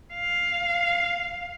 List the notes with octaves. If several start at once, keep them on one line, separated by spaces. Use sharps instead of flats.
F5